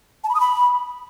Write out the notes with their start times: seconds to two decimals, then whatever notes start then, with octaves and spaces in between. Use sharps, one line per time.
0.24 A5
0.29 B5
0.35 D#6
0.40 B5